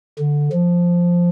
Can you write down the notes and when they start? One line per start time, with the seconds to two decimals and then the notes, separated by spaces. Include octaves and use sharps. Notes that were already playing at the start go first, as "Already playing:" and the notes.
0.19 D3
0.52 F3